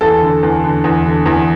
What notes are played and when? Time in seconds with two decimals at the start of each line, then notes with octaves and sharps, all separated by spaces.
0.01 E2 A4
0.22 D3
0.43 E2
0.63 D3
0.84 E2
1.05 D3
1.26 E2